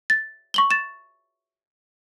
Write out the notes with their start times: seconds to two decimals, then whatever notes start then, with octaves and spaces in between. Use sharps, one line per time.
0.10 A6
0.54 C#6 F#7 G7
0.71 A6 E7